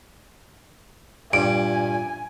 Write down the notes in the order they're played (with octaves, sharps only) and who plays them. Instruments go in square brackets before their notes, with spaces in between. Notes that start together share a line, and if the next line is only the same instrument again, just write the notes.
[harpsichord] G2 [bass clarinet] A#2 [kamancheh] G#5 [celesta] D7